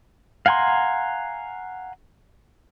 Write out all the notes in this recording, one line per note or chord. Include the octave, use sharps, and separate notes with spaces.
F5 F#5 G#5 A#5 C6